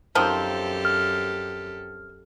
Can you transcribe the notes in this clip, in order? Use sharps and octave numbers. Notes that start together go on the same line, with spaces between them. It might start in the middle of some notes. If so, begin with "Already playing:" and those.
F#2 D#3 F3 C4 G4 A4
F6